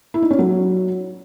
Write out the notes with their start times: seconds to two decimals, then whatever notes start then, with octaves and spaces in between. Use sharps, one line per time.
0.14 E4
0.22 D#4
0.31 C#4
0.39 F#3